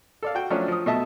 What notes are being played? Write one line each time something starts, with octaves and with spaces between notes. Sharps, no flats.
A4 D5 F5
F#4 G5
F3 F#3 A3 C#4 D4
F3 D#6
B2 A3 D#5 E5 A5